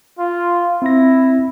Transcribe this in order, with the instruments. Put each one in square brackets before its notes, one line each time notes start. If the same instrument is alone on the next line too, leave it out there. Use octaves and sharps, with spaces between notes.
[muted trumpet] F4
[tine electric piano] C4 A#6 [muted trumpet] E4